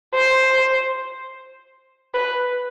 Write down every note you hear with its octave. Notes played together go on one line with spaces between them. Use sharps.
C5
B4